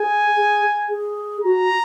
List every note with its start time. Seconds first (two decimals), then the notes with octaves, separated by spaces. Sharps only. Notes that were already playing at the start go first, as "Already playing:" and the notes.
Already playing: G#4 G#5
0.37 G#4
0.89 G#4
1.44 F#4 A#5